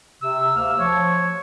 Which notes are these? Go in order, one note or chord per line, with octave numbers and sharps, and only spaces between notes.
C3 E6
D2 A#3 F6
F3 C#5